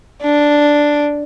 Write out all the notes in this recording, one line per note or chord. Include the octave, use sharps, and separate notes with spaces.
D4